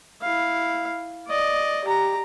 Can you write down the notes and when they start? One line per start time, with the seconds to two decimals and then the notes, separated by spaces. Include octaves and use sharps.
0.22 E4 F5
1.27 D5 D#5
1.84 G4 A#5